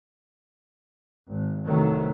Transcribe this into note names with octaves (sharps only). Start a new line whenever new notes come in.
G#1
A1 F2 C3 D#3 F#3 A3